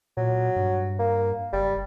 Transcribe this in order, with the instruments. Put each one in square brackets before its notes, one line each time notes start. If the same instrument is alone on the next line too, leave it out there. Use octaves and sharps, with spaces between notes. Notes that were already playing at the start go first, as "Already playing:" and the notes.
[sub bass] A#2 [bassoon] F#3
[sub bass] G2
[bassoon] A#3
[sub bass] F#1 [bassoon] G3